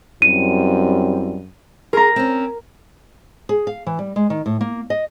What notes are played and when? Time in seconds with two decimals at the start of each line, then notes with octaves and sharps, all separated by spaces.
0.22 F#2 G3 C4 E4 D#7
1.93 G#4 A#4 A#5
2.16 C4 C#4
3.49 G#4
3.67 F5
3.87 E3
3.99 G3
4.16 G#3
4.30 D#3
4.46 A2
4.61 A#3
4.90 D#5